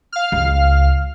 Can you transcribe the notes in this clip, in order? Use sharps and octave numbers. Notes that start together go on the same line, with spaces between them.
F5 F6
C#2